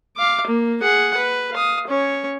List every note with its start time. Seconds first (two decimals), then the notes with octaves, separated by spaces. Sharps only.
0.17 F5 D6
0.47 A#3
0.82 G#4 F#5
1.17 B4
1.52 F5 D#6
1.88 C#4 C#5